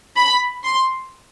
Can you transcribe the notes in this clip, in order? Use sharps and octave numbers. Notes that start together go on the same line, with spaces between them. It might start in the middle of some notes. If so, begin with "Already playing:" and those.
B5
C6